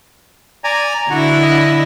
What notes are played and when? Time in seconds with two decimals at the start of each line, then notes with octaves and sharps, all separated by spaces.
0.64 D5 G#5 A#5
1.10 D3 E4 F#4
1.42 D#5